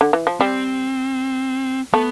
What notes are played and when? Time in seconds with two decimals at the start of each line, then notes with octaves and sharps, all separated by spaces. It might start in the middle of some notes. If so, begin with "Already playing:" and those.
0.01 D3
0.13 E3
0.27 F3
0.40 G3 C4
1.94 A3 B3